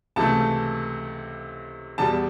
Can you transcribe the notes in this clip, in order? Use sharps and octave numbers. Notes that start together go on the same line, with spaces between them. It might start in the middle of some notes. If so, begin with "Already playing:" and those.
C#2 C3 E3 A3 A5
E2 B2 G3 A5